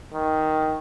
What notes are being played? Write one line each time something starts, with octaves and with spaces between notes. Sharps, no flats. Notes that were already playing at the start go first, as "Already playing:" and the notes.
D#3